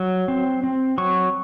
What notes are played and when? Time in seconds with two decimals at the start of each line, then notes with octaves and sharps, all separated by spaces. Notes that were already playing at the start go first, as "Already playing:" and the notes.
Already playing: F#3
0.28 C4
0.64 C4
0.98 F#3 C#6